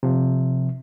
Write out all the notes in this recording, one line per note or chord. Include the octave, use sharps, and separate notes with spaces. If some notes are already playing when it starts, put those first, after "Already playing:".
C3 F3